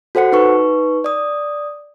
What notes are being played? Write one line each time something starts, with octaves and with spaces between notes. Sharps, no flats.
F#4 A4 C5 F#5 C#7
D#4 B4 C#6
D5 D#6